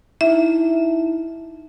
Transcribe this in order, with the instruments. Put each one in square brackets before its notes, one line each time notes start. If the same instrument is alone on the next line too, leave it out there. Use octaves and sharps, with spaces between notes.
[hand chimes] D#4 E4 [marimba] E5